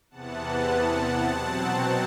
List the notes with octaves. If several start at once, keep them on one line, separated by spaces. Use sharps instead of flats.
E2 C3 E3 B3 F#5 A5
B2 F#3 C4 F#5 A5